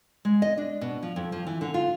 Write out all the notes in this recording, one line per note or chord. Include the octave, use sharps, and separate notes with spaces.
G#3
D#5
D4
B2
F3
F2
F3
E3
D3
F4